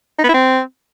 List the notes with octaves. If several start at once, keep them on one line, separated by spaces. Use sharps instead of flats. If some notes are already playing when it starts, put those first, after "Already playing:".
D#4
B3
E4
C4